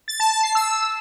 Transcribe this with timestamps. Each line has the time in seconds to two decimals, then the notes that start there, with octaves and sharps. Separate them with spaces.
0.08 A6
0.20 A5
0.31 A5
0.43 C7
0.55 E6